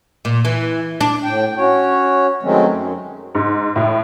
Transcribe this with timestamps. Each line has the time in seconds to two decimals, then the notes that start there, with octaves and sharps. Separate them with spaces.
0.25 A#2
0.45 E3
1.01 D4
1.24 A2 G5
1.57 C#4 F#4 C#5
2.43 D#3 F#3 G#3 A3 C4 C#4
2.69 F#2
3.35 G#2
3.76 A2